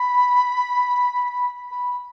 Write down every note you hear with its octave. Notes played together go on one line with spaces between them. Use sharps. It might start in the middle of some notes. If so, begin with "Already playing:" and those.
Already playing: B5
B5